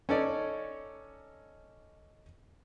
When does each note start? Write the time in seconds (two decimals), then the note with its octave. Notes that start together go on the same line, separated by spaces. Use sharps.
0.09 C#4 D#4 A4 C#5 D5